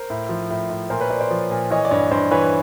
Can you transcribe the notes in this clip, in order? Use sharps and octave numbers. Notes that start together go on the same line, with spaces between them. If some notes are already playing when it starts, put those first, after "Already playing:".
Already playing: A#4 C5
A2
F3
A2
A2
A#2 A#4 C5
B4 C#5
A#2 C5 D5
C5 D5
F3
A#2
E3 C#5 D#5
D5
G2 C#5 D#5
G2 C5 D5
E3 B4 C#5